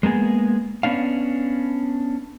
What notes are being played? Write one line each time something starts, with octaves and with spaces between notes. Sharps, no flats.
G#3 A#3 B3 G#4
B3 C#4 D4 F5